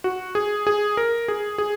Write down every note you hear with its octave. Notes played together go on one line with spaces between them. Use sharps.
F#4
G#4
G#4
A#4
G#4
G#4